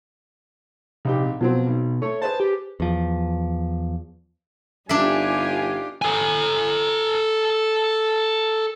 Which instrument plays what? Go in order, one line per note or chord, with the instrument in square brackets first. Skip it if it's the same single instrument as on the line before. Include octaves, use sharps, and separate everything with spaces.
[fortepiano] A#1 D#4 G4 [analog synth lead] C3
[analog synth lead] B2 [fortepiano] F3 F#3 C4
[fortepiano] B1
[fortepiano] A3 [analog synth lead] C#5
[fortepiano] G#4 B4 C5 [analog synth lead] A5
[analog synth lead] G4
[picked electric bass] E2 F3
[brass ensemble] G1 G3 G#5 [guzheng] D4 E5 [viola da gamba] D#4 F4 G4
[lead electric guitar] A4 G#5